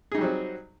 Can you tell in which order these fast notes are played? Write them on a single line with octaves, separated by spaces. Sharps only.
G#4 D#4 G3 F#3 C4